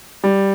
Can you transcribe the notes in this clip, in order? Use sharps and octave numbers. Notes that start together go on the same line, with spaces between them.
G3